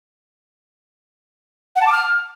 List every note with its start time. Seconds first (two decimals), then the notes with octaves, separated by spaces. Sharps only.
1.76 F#5
1.81 A5
1.87 D6
1.92 F6